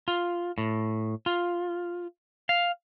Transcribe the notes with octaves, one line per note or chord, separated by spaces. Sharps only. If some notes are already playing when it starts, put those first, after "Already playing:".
F4
A2
F4
F5